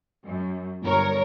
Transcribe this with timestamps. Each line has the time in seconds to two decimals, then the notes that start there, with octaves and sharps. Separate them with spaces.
0.24 F#2
0.83 G1 A#4 C#5